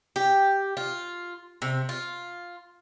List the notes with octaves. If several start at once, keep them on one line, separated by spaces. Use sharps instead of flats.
G4
F4
C3
F4